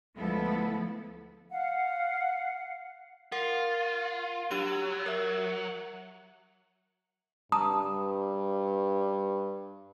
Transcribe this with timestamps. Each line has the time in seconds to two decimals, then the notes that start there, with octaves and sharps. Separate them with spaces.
0.16 D2 F3 G#3 B3 E4 A4
1.51 F5 F#5
3.32 F4 A#4 F#5
4.51 F#3 D4 G4 D#7
5.06 A#4 E5
7.52 G2 A5 A#5 D#6